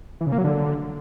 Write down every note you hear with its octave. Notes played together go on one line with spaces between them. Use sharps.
E3
C#3
A#3
F#3
D3